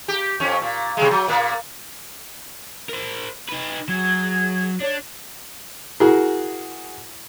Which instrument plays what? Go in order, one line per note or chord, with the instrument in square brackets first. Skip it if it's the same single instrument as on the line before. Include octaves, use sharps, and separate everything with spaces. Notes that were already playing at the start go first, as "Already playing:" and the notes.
[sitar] G4
F2 C#4
A#2
C3 G3 G#3
F#3
A#2 A#3
[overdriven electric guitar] A#4 C5
D#4 B4
[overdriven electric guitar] F#3 [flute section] G#4 G#6
[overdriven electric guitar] D4 [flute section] C#5
[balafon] E4 [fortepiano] F#4 G#4 A#4